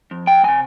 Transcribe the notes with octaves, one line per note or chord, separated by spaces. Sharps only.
F2
G5
C3 F3 G#5